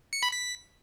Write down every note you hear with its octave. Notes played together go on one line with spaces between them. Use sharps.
C#7
B5
B6